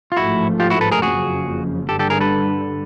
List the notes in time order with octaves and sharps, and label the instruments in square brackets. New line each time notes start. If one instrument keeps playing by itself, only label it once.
[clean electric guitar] F4
[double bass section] A1 G#2 F3 A3 [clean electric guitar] E4 F#4
[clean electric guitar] F4 G4
E4 F#4
A4 B4
G#4 A#4
[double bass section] F#1 F2 C#3 F3 [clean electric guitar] F#4 G#4
[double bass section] G2 D3 G3 [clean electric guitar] G4 A4
[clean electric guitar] G4 A4
G#4 A#4
A4 B4